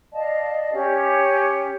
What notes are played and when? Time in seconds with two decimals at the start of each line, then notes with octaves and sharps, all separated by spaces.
0.13 D5 D#5 F5 A5
0.73 C#4 G4